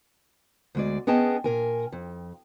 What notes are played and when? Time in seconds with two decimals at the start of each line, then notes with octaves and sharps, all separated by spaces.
0.75 D2 G#3 D5
1.07 B3 C#4 G#4 D#5 G5 A5
1.44 A#2 A#4 G#5
1.92 F2